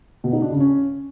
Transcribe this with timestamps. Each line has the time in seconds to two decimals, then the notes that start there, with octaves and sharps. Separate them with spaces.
0.24 B2
0.33 D#4
0.42 D4
0.51 C#3
0.60 C#4